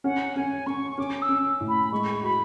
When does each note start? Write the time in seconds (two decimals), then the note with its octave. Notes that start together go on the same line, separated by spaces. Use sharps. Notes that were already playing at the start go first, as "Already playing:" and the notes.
0.04 C#4 F#5
0.36 C#4 G#5
0.66 C#4 C#6
0.91 C#6
0.98 C#4 D6
1.22 E6
1.29 C#4
1.60 A2
1.68 B5
1.92 G#3 C#6
2.23 F#4 B5